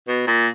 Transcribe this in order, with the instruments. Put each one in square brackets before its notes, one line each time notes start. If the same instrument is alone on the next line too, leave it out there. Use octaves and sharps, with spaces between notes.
[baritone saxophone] B2
A#2